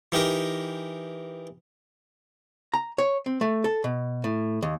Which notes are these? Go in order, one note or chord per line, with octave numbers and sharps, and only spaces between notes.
E3 D#4 G4 A#4
A#5
C#5
C4
A3
A4
B2
A2
D#2